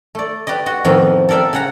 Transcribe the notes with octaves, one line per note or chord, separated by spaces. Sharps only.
A3 D5
G4 B4 D5 D#5
F#4 D#5
F2 A2 D#3 F3 B3
A4 A#4 D5 E5 G5
C#3 F#5 A#5